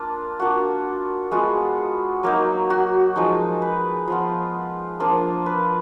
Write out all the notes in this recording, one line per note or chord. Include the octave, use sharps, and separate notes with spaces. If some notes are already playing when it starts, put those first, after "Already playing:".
Already playing: A#3 D4 F4
A#3 D4 F4 F#4
G#3 B3 F4 F#4
F#3 A#3 D#4
F#4
F3 G#3 D#4
B4
F3 B3 F4
F3 A#3 D4 F4
B4